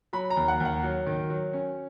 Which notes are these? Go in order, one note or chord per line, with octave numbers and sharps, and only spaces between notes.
F#3 B5
A#5
D#2
F#5
D#2 F#5
F#3
D#3
F#3
C#4